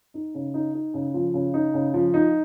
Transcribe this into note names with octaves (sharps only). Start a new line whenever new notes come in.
D#4
C#3
D#4
D#4
C#3
F3
C#3
D#4
C#3
F3
D#4